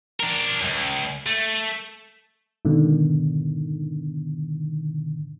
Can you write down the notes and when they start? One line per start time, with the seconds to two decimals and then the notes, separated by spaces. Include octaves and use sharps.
0.20 D4 A#4
0.61 C#2 F#2
1.26 A3
2.65 G#2 B2 D3 D#3